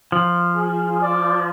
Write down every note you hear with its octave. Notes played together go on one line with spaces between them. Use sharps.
F3
G#4
D5